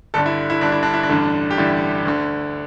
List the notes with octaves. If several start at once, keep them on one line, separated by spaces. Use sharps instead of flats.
G1 G2 D3 A4
E4
E4
G1 G2 D3 D4
E4
D4
E4
D4
A1 G2 D3
G4
A1 G2 D3 E4
D2 D3